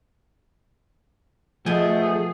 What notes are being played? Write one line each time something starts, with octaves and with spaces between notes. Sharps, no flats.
B2 F3 A3 G#4 G#5